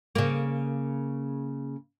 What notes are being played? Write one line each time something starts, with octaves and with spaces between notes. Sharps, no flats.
C#3 A#3